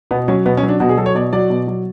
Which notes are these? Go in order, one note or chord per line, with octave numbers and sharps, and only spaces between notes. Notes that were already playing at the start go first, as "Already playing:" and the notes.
B2 B3
F#3 C#4
B2 B3
C#4
F#3
D4
B2 F#4
G#4
F#3 A4
C#5
B2 D5
F#3 D5
B2
F#3